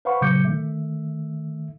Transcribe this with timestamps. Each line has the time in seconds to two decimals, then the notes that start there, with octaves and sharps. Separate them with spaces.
0.05 B4 C5 F5 F#5 B5 C#6
0.21 A#2 C#3 F#3 D6 G6 C#7
0.45 D#3 A3 E5